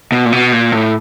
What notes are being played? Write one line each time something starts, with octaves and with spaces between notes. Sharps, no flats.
B2
A#2
B2
A#2
A2